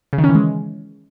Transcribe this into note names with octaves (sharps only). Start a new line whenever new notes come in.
C#3
D#3
C#4
E3
G#3